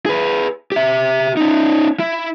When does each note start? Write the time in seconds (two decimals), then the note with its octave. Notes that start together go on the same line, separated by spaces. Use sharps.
0.06 G#4 B4
0.72 G4 E5
1.37 C#4 D#4
2.00 E4